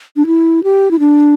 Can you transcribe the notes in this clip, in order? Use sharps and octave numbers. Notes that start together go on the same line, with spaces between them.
D4
E4
G4
E4
D4